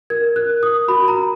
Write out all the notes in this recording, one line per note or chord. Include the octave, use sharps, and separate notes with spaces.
A#4 G#6
F#6
A#4
D#6
F#4 B5
A#5